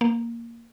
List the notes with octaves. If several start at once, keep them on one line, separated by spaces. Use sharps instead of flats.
A#3